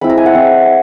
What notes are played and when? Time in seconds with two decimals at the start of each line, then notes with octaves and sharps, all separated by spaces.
0.01 G#3 C4 E4 B5
0.10 A#5
0.17 G#5
0.26 F#5
0.35 G#3 C4 E4